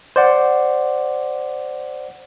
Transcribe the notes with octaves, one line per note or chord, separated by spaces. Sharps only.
C5 D5 F#5